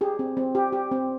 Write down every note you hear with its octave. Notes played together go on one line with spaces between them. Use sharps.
G4 G#4
C4
C4
G4
G4
C4